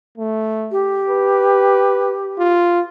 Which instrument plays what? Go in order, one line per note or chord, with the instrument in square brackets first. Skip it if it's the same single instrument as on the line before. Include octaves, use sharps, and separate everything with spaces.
[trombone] A3
[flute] G4
[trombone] B4
F4